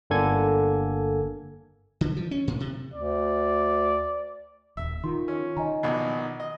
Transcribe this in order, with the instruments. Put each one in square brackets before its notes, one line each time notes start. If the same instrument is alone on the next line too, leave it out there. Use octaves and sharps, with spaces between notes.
[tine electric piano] G1 D3 A#3 A4 G#5 G#6
[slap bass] D3
F3
C#4
A2
C3
[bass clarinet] D2 [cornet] D5
[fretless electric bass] D#1 [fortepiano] E5
[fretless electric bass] D#3 [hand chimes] F4 C6
[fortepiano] C#4
[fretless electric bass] D#3 [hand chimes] D#5 G#5 A#5
[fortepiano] A#1 B2
D#5